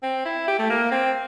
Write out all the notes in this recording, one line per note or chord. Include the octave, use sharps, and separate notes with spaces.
C4
E4
G4
A3
A#3
C4